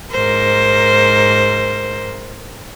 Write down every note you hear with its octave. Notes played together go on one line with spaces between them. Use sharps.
G#2 A#4 C5